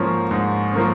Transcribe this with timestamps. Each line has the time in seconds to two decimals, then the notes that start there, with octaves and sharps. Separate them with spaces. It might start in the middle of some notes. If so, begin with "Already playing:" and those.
Already playing: G#2 F3 A#3 C#4
0.31 G#2
0.73 F3 A#3 C#4